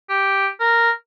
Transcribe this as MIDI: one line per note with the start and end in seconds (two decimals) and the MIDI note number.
0.09 0.47 67
0.60 0.90 70